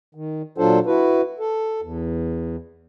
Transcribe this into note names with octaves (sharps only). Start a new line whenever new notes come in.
D#3
A#2 F#3 D4 F4 A4 C5
E4 F#4 B4
A4
E2